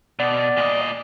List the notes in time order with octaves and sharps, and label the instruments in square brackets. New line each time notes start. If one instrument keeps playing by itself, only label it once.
[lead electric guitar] B2 [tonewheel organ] D5
[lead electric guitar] A#2 D#5